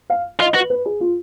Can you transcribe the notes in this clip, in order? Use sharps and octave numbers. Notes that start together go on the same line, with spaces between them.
F5
F4 D#5
F#4 B4
B4
G#4
F4